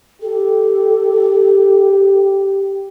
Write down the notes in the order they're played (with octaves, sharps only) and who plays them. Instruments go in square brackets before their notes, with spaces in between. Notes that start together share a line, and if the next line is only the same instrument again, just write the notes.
[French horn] G4 [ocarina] A4